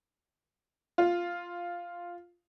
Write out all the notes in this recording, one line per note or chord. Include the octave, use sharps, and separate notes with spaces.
F4